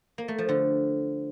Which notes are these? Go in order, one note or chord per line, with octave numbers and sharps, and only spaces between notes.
A#3
A3
F3
D3